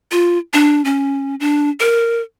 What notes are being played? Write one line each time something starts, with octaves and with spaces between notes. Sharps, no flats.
F4
D4
C#4
D4
A#4